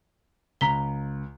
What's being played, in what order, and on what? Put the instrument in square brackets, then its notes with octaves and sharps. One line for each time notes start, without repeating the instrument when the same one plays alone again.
[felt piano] C#2 [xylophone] A#5 B6 G7